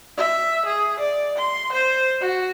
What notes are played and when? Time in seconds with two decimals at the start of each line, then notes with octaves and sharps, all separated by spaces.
0.17 E5
0.66 G#4
1.00 D5
1.38 C6
1.73 C5
2.21 F#4